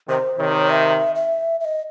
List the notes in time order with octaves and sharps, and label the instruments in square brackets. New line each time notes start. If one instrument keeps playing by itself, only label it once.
[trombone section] C3 D#3 [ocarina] C5
[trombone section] C3 D#3 [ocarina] C#5
[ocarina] E5
E5
E5
D#5